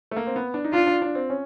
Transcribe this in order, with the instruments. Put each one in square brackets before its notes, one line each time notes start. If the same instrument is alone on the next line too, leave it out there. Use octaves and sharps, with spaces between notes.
[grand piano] A3
A#3
C4
B3
D4
D#4
[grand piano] D4 [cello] F4
[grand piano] D4
D4
C4
C#4